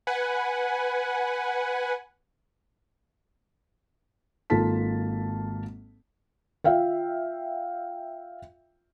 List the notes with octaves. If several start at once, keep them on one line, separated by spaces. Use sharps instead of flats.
B4 F#5 G#5
G#1 A#3 F4 A4 A5 B6
F4 E5 F5 G5